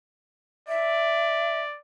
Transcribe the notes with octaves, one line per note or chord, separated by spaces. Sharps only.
D5 E5